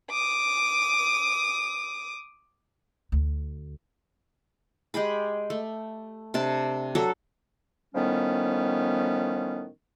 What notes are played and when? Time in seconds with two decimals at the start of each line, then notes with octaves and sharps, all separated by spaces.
0.10 D6 D#6
3.12 D2
4.94 G#3 G4 G#4 B5
5.50 A3
6.34 C3 D4 A5
6.95 F#3 F#4 A4
7.95 A2 D#3 F3 G3 B3 C#4